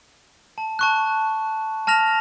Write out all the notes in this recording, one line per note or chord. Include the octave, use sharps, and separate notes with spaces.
A5
A5 C#6 F#6
A5 F6 A#6 F7